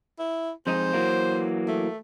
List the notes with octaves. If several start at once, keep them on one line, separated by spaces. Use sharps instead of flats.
E4
F2 G#3 D#4 C5
E3 F#3 A#3
A3